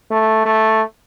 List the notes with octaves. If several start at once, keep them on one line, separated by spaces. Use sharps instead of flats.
A3
A3